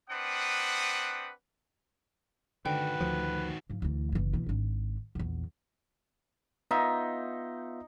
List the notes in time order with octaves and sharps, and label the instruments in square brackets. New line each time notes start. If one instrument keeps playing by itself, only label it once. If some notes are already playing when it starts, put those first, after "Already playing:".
[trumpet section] C4 D4 B4 F#5 D#6
[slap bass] D3 [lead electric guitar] D#3 F#4 [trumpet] B4 [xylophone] G5
[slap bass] D2 F3
[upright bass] G#2 F3
D2 E3
F#1 E3
B2 E3
G#1 D4
A#1 E2
[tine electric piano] B3 F4 E5 [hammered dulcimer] D#4